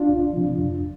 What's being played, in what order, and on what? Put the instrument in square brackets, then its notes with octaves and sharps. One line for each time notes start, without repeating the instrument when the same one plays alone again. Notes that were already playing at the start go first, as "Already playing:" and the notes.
Already playing: [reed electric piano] D4 F4
C2
C3 F3
F2